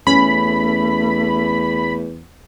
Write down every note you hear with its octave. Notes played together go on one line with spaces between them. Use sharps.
E2 A3 C#4 B5